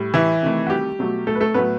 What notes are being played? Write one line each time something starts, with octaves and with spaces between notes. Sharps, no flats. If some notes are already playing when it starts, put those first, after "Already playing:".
Already playing: A2 G3
E3 E4
C3 D#3 A3
F#4
G3 G4
B2 F#3 A3
A3 A4
B4
A3 A4
A2 F#3 A3 B3 B4